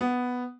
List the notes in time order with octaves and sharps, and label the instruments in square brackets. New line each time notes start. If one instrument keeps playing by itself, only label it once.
[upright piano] B3